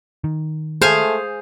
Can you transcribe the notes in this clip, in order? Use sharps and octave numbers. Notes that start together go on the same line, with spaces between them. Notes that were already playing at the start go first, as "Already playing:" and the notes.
D#3
A3 G#4 C5 F5 G#5